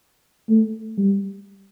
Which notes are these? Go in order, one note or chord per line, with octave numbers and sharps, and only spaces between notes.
A3
G3